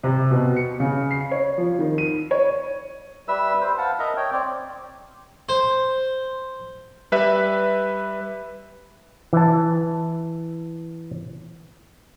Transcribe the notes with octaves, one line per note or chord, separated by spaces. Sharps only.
C3
B2
C#7
C#3
C7
C#5
F3
D#3
D#7
C#5
G3 B4 E5 E6
B4 C5
F5 F#5 A5
A#4 D#5 E5 A#5
C#5 G5
C4 D5
C5
G3 B4 E5
E3 A5